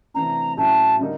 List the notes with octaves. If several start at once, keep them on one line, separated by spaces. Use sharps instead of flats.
C3 E3 A3 D4 A#5
A2 F#3 A3 C#4 E4 A5
D3 G3 A#3 D#4